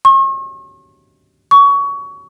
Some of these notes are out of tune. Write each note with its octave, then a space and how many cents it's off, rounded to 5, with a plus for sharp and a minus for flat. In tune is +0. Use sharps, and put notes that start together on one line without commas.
C#6 -40
C#6 +25